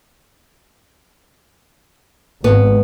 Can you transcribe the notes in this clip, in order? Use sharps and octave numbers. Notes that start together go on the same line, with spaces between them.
G#1 B3